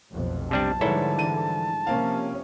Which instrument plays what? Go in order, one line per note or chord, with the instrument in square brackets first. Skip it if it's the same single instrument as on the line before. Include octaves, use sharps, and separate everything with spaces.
[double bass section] F1 B1 F2
[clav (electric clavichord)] C3 G3 D4 [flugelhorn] A5
[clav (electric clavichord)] G#2 E4 A4 [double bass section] D3 F3 G3 [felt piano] B4 C#5
[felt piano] E3 D#7
[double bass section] C3 F3 C#4 [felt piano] A#3 F5